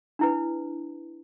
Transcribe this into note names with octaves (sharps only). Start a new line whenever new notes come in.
D4 E4 B4